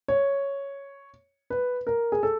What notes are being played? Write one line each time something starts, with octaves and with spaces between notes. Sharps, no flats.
C#5
B4
A#4
G#4
A4